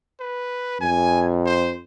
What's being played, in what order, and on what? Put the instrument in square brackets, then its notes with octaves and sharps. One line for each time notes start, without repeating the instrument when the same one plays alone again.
[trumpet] B4
[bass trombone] F2 [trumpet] G#5
[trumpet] C5